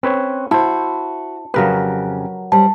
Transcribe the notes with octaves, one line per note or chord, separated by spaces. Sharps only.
C4 C#4 B4 C#5
E4 F#4 C5 A5
F2 C#3 F#3 G4 A#4 B4
G3 C5 A5